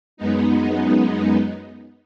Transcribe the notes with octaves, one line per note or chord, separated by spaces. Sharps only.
F#2 G#3 B3 D#4